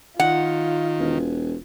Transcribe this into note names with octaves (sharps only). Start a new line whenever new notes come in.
D#3 F4 F#5
E1